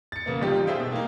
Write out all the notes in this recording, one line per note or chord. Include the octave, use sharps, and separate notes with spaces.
A6 C#7
C#3 A#3 B3
G1 G3 D#4 F4 G4
G#4 C5 E5 F5 G5
B2
A#3 D#4